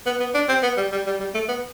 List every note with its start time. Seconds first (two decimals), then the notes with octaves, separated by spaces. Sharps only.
0.06 B3
0.20 B3
0.34 D4
0.49 C4
0.63 B3
0.77 G3
0.92 G3
1.06 G3
1.20 G3
1.34 A3
1.49 B3